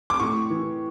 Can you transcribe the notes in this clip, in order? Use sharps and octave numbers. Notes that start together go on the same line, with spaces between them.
D6
A2 C#6
E3